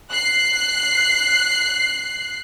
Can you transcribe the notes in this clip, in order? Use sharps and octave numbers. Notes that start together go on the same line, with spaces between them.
F#6 C7